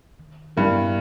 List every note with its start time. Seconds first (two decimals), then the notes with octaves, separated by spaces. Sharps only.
0.20 D#3
0.57 G2 G3 B3 E4 A#4